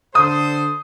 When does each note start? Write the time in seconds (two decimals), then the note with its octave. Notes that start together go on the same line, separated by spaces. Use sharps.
0.15 D3 A4 C5 D#6